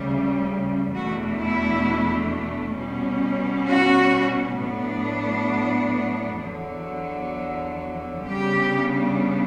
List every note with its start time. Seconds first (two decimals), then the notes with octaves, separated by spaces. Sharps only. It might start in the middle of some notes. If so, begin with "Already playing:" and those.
Already playing: D2 C#3 G3
0.94 E2 B2 A3 D4 F#4
1.40 E4
2.77 B2 G3 C#4
3.69 F#4
4.59 A2 F#3 B3 D4
6.42 E2 D3 F#3
8.24 C#3 G3 B3 D4 G4